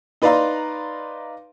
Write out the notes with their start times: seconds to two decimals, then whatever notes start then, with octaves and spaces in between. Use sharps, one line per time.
0.22 D#4 B4 D5 F5 A#5 C6